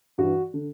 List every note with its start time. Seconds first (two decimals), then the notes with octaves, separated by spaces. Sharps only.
0.18 G2 E3 F#4
0.54 D3